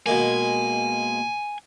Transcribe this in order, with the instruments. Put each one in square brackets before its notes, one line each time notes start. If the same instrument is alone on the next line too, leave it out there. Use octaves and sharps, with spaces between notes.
[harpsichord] B2 G#3 A#3 [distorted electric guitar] G#5